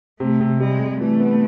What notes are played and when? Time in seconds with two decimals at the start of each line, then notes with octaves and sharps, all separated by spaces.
0.20 C3 A3
0.41 C3
0.60 G3 G#3
0.80 C3
1.00 E3 A3
1.20 B3